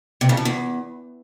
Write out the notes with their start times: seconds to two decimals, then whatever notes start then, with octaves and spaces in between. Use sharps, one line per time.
0.21 C3
0.29 C#3
0.37 A2
0.45 E2